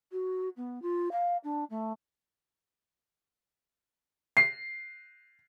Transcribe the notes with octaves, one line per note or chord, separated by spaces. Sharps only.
F#4
B3
F4
F5
D4
A3
C7